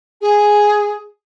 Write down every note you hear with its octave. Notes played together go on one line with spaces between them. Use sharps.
G#4